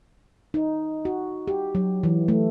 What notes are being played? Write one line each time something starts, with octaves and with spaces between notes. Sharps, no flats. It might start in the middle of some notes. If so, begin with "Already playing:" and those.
D#4
F#4
G4
F#3
E3
A3